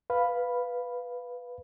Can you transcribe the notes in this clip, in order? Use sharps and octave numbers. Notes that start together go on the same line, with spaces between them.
B4 F5 B5